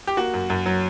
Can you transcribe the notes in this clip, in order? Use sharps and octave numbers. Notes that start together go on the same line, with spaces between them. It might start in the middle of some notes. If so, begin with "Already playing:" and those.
G4
A#3 F#4
F#2
F#2
F#3